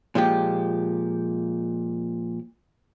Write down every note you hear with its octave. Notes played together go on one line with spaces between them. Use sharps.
A#2 F3 G#3 G4